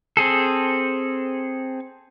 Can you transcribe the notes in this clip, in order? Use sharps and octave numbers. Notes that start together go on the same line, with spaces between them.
C4 G#4 A4